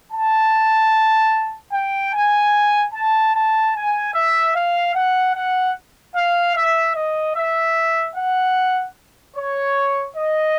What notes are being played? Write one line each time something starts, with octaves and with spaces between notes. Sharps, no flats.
A5
G5
G#5
A5
A5
G#5
E5
F5
F#5
F#5
F5
E5
D#5
E5
F#5
C#5
D#5